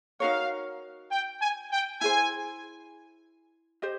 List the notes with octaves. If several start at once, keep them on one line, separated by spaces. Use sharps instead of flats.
D#4 F#4 A#4 C#5 F5
G5
G#5
G5
E4 G#4 C5 G#5
G4 C5 D#5